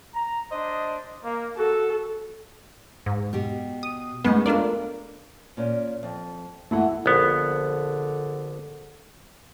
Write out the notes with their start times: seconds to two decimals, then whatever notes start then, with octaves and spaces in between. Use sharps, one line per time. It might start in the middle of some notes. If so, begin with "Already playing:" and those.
0.14 A#5
0.52 D4 C5 D#5
1.24 A#3
1.57 F#4 A4
3.06 G#2
3.33 B2 G4
3.83 D#6
4.25 G#3 A3 B3 C#4 D#4
4.46 D4 F4 A4 A#4 D5
5.57 A#2 C#4
6.03 F2
6.71 E3 G#3 A3 E4 F#5
7.06 A#1 D3 B3